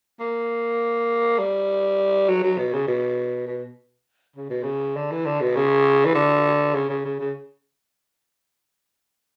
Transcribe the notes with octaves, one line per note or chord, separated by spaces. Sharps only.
A#3
G3
F#3
F#3
B2
C#3
B2
B2
C#3
B2
C#3
D3
E3
D3
B2
C#3
E3
D3
C#3
C#3
C#3
C#3